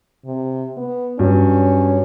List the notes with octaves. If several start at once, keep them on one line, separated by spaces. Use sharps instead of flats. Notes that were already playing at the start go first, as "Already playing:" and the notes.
C3
B3
G2 F#3 C#4